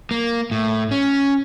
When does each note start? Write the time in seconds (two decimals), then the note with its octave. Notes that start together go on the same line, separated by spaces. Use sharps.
0.11 A#3
0.51 A2
0.91 C#4